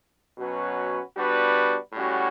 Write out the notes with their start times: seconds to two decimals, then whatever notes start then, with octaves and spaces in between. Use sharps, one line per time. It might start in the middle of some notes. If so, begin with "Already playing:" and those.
0.37 B2 F#3 C#4 F#4 B4
1.15 G3 B3 D4 F#4 B4
1.93 A2 G3 C#4 F#4